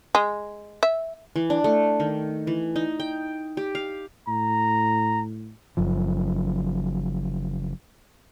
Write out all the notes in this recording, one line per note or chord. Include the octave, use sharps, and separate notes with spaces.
G#3
E5
E3
D4
A3
D#3
E3
D#4
G5
G4
F5
A2 A#5
F#1 F#2 F3